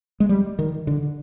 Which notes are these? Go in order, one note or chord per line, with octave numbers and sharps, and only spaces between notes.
G#3
G3
D#3
D3